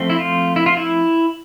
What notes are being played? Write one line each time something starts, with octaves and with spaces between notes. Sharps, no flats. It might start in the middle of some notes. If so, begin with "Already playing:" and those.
Already playing: F3 A3 C4
E4
F4
E4
F4
E4